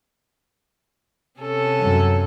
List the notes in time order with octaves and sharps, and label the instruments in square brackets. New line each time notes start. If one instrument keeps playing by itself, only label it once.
[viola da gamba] C3 C#4 A4
[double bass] F#2